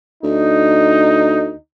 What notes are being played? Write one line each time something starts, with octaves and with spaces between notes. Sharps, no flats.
D2 D#4